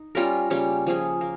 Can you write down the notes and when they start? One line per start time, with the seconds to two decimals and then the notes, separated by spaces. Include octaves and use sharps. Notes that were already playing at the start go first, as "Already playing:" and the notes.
Already playing: D#4
0.15 G3 C#4 F4 A#4
0.50 C#3 G3 A#3 C#4
0.87 F3 A#3 C#4 G#4
1.21 A#3